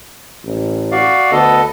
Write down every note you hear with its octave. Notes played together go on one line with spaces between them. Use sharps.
A1
F#4 D5 F5
D2 B3 A4 D#5